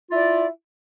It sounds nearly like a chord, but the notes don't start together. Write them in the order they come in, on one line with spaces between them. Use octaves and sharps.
F4 E4 D5